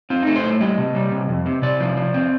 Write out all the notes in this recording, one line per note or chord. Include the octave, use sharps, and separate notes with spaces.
C4 F4
A3 D#4
C5
A2
G3 D#5
C3
G3
C3
F2
C3
C3 D5
F3
F3
C4